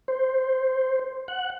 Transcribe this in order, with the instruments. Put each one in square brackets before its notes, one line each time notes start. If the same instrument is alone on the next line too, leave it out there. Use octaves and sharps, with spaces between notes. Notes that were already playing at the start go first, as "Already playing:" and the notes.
[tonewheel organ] C5
F#5